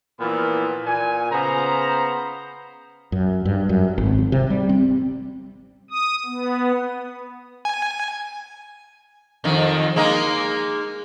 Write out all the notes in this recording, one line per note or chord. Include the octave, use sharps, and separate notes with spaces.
A#2 E3 F3 B3 B5
A#2 G#5
C#3 B3 C5 A#5
F#2
G2
F#2
G#1
C3
G3
C4
D#6
B3
G#5
F2 D#3
G#3 A#3 D#4